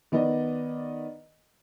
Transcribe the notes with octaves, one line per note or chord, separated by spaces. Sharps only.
D#3 B3 D5 D#5